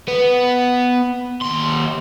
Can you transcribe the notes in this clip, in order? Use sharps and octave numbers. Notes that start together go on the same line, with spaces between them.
B3 B4
D#2 C6